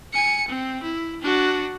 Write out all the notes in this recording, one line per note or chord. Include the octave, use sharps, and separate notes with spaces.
G#5 C#7
C4
E4
D4 F#4